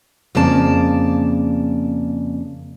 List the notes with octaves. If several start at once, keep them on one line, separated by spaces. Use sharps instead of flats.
F2 C#3 A#3 D5 A5